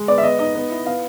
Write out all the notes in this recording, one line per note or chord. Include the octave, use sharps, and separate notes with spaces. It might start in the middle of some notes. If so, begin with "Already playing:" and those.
Already playing: G#3
B3 D5
E5
B3 D#5
D#4 D#5
B3
E4
B3 F5